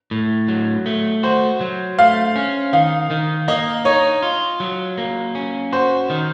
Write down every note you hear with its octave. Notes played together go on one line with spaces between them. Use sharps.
A2
F#3
A3
F#4 C5
F#3
A3 F5
C#4
D#3 F5
D#3
A#3 D#5
D#4 C#5
F4
F#3
A#3
C#4
F#4 C5
D#3